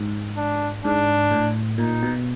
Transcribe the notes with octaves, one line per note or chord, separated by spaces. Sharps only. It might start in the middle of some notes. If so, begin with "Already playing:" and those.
Already playing: G#2
D4
G#2 D4
A2
A#2 D#4
B2